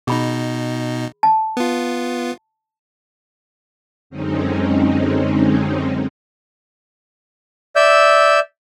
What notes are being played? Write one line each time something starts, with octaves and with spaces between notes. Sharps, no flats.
B2 D#4 G#4 B5
A5
B3 F4
F#2 D3 G#3 C4 C#4 D#4
D5 E5 E6 G6